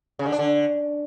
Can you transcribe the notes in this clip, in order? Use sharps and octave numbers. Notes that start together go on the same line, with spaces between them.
C#3
D3
D4
D3